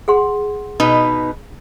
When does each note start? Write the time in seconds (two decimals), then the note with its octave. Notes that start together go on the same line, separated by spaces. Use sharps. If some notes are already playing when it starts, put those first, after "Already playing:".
0.08 G#4 F#5 C6
0.80 B2 D#4 B4